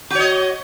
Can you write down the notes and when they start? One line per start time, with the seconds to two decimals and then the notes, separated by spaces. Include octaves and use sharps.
0.10 F#4
0.15 C#5
0.20 D#5